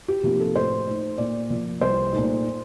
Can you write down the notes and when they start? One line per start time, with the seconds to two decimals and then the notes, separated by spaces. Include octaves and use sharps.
0.08 G4
0.23 C3 F3 A#3 D#4 G4
0.40 A4
0.55 A2 C5
0.87 A3 D#4
1.18 A#2 D5
1.50 F3 A#3
1.81 C2 C5
2.13 A#2 A3 D#4